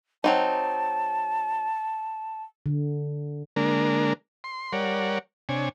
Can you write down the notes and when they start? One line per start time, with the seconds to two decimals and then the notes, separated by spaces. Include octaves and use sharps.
0.24 F#3 C4 D#4 A5
2.66 D3
3.56 D3 G#3 A#3 D4 A#4
4.44 C6
4.73 G3 A#4 C#5 D5 F#5
5.49 C3 D4 C#5 G#5